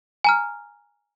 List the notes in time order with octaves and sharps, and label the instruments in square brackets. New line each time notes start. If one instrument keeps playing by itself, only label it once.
[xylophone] G#5 A#5 F6